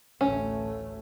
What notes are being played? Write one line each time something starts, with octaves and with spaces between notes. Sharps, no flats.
A1 D2 A3 C#4